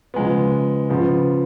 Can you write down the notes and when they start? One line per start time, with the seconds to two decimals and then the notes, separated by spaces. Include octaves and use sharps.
0.14 C#3 F3 G#3 B3
0.90 C#3 F3 B3